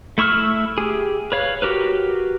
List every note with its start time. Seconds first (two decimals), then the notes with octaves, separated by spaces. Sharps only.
0.18 A3 E4 C#6 E6 F6
0.78 G4 G#4
1.32 B4 C#5 F5
1.62 F#4 G4 A#4 B4